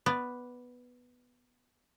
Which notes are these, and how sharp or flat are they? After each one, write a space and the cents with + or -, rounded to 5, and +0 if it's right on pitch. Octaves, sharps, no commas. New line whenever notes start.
B3 +0 D5 +0